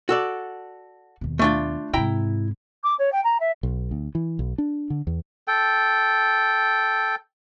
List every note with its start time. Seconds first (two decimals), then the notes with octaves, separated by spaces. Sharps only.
0.09 F#4 A4 D5
1.21 D#2 B2
1.39 A3 D4 F4
1.93 G#2 C3 E4 G5 A#5
2.83 D6
2.98 C#5
3.12 G5
3.24 A#5
3.40 E5
3.63 B1
3.91 D2
4.15 E3
4.39 B1
4.58 D4
4.90 D3
5.07 E2
5.48 A4 G5